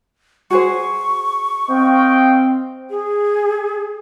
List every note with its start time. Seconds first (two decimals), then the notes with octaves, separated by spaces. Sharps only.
0.50 F#4 G#4 C5 C#6
1.70 C4 D#5 F5 G5
2.90 G#4